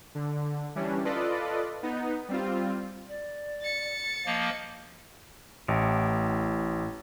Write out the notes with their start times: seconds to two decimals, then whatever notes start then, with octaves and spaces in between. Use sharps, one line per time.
0.15 D3
0.75 E3 G3 C#4 D4
1.05 F4 A4 B4 D5 D#5
1.83 B3 D#4
2.28 G3 C4 F4
3.08 D5
3.62 A6 C#7
4.26 F3 A#3 D#5
5.68 A1 A2